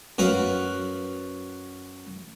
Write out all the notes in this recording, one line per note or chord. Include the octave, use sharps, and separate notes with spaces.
F#2 F#4 B4 F5